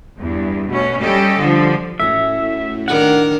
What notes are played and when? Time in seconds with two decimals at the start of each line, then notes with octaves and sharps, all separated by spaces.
0.18 E2 G2
0.69 B2 A3 C#4
1.01 G3 C#4 G4 A4 D#5
1.39 D3 F3 G3
2.00 A2 A3 C#4 F#4 E5
2.88 D#3 D4 A#4 F#5